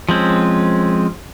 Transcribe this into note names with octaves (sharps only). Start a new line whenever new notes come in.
F3 G#3 C4 C#4